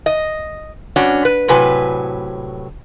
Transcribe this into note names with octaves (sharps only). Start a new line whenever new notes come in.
D#5
G2 C#4 D4 F#4
B4
A2 C3 F#3 B4 G#5